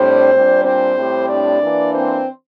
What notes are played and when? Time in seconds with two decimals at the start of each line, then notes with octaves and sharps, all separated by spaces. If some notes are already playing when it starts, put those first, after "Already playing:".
Already playing: A2 G3 C4 D4 C5
0.33 A#2 G3 D4
0.65 C4 C5
0.97 A2 G3 C4
1.29 D4 D5
1.62 E3 A#3 D4
1.95 C4 C5